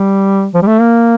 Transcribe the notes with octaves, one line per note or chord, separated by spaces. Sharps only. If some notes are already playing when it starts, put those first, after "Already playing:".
Already playing: G3
F3
G3
A3
A#3